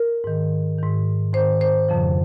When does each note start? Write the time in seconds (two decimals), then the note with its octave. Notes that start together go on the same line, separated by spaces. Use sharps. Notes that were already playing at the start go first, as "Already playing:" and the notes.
Already playing: A#4
0.24 G#2 D#3
0.79 G#2 D#3
1.34 G#2 D#3 C5
1.61 C5
1.89 F2 C#3 F3